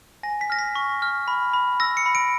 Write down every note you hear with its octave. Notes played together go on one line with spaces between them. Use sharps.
G#5 A#6
B6
F6 A#6
B6
C#6
F6
B5
B5
E6 A#6
C#7
B5
D7